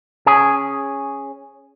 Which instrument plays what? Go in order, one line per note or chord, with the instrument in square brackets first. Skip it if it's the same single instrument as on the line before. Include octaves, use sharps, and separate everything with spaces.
[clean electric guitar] C#4 G#4